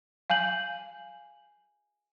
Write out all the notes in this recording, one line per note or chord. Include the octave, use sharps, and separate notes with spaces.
F5 G#5 G6 F#7